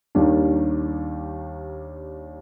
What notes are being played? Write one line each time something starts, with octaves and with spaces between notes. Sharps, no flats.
D#2 D#3 G3 D4